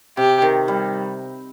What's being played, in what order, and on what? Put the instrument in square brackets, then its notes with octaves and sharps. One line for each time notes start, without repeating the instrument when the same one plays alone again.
[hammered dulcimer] C3 [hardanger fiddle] G4
[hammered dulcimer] D#3
G3